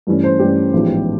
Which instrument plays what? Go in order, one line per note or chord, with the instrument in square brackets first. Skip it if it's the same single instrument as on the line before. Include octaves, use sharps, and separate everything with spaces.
[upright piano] G2 E3 A3 C#4
C5
G2 E3 A3 C#4 G4
A1 G#2 F3 G#3 B3